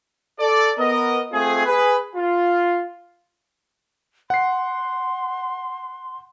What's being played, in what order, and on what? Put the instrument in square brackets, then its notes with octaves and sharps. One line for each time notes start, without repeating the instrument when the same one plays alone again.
[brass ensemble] A4 D5
B3 A#4 D#5
A3 C4 F4 G#4
G#4 B4
F4
[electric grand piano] F#5 C7 [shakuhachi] C6